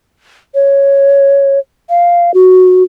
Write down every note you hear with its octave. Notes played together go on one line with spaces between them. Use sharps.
C#5
F5
F#4